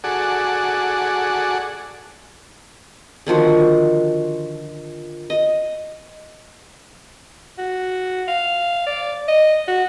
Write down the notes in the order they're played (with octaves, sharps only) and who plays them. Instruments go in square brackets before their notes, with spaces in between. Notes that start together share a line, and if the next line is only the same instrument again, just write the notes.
[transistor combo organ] F#4 G#4 A4 D5 F#5
[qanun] D3 D#3 F3 F#4
D#5
[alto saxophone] F#4
F5
D5
D#5
F#4